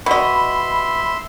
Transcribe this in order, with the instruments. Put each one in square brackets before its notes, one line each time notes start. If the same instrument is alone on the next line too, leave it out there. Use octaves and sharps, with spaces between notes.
[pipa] B2 D#5 [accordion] E5 C6 [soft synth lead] B5